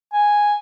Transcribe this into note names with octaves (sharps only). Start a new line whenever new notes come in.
G#5